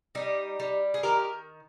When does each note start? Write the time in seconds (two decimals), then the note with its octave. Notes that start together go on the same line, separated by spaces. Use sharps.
0.15 G3 D#4 G4
0.60 G3
0.94 G#4
1.03 D#3 G4 A#4